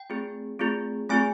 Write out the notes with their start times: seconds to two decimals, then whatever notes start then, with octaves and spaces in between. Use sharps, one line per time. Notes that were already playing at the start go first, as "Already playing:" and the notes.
Already playing: G5
0.10 A3 C4 F4 G#4
0.59 A3 C4 F4 G#4
1.09 A3 C4 F4 G#4 G#5